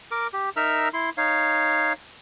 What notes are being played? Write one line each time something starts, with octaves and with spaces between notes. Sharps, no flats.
A#4 D6
G4
D#4 A#4 E5 A#5 E6 F6
E4 C6
D#4 C#5 F5